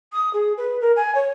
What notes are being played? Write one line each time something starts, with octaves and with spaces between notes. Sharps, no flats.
D#6
G#4
B4
A#4
G#5
C#5